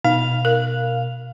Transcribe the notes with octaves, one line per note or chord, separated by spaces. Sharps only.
B2 D#4 F5
A#4